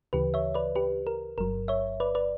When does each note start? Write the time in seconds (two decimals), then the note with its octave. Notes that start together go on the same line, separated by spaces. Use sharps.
0.13 D2 C#3 E3 G4 B4
0.34 C#5 E5
0.54 B4 D5
0.76 G4 B4
1.07 A#4
1.38 G1 G2 F#3 A#4
1.68 C#5 E5
2.00 B4 D5
2.15 B4 D5